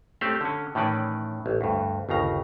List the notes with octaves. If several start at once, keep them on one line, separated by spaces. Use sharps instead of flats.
A3 C4 C#4 G4 C5 D5
D3 C#4
A2 D#3 E3 C#4 D5
A1
D2 G2
G1 D#2 C#3 A#5